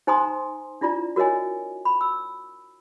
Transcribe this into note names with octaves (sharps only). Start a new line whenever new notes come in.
D#4 C5 G#5 A#5 C6 D#6
D4 E4 F4 D5 A#5
F#4 A#4 C#5 D#5 G#5
B5
E6